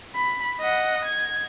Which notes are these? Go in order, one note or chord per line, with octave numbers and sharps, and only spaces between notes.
B5
D#5 F#5
G#6